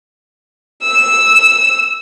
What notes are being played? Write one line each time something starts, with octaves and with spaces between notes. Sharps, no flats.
E6